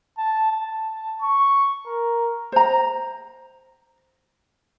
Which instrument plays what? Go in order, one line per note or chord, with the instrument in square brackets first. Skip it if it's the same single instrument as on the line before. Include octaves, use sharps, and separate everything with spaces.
[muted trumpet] A5
A5
C#6
A#4
[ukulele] C5 A#5